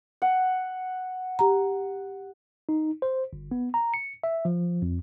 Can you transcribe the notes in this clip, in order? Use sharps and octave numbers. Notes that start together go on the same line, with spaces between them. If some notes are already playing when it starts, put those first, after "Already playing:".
F#5
G4 A#5
D#4
C5
G1
B3
A#5
C#7
E5
F3
F2